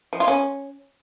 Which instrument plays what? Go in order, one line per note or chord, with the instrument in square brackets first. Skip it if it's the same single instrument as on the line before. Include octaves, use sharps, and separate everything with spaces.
[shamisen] F3
F4
C#4